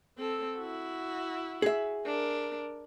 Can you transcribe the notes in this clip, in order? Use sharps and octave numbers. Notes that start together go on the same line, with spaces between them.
C4 A4
E4 F#4
G#4 E5
D4 A#4